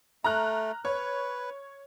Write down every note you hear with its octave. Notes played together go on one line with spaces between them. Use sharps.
A3 A#5 F6 F#6
B4 C#5